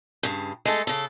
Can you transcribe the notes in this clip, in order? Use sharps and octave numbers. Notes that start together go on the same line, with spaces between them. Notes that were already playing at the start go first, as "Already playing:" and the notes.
G2 C#3
G#3 A3 A4
C#3 A4